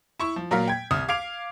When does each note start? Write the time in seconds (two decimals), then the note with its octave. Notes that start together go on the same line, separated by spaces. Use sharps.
0.19 E4 C#6
0.36 F3
0.51 A#2 F#3 A#4 F5 B6
0.68 G5 G#6
0.91 C2 D#6 F6
1.08 F5 D6 G#6 C7 D7 F7